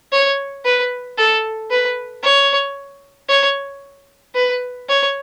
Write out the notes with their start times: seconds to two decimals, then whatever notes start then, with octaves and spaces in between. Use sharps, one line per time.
0.12 C#5
0.65 B4
1.18 A4
1.70 B4
2.23 C#5
3.29 C#5
4.35 B4
4.89 C#5